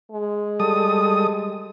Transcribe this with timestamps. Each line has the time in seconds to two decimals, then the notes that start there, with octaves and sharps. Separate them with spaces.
0.12 G#3
0.60 G3 A4 D#6